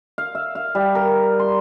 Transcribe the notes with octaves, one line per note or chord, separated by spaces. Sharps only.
F5
E5
F5
G3
A#4
C6